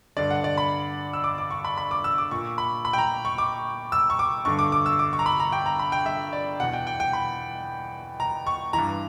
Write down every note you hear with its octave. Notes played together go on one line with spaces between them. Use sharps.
G2 D3 D5
F#5
D5
B5
E6
D6
D6
C#6
B5
B5
D6
E6
D6
A#2 C#6
B5
B5
G5
A#5
C#6
D6
E6
C#6
D6
G2 D3 C#6
D6
D6
E6
D6
C#6
A#5
B5
A#5
G5
A#5
B5
G5
E5
D5
E2 B2 F#5
G5
G5
G5
B5
A#5
C#6
G2 E3 A#5